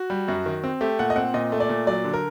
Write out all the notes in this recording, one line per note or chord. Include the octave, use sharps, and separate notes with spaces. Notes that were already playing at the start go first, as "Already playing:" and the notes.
Already playing: F#4
G3
F#2
D#3
C4
A3 G4
A#2 F#5
D#5
C4 F#5
A#2 D#5
A3
D5
A#2
F#3 D5
D3
A#4